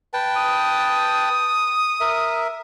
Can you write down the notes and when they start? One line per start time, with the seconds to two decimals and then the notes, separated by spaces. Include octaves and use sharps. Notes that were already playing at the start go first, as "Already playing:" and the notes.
0.13 B4 G5 A5
0.37 D#6
2.00 A#4 E5